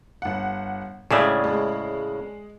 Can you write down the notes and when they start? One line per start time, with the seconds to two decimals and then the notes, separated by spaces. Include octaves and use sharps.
0.22 G1 F#5
1.11 A2 C#3 G#3 D4 G#4 D5 E5
1.44 G#3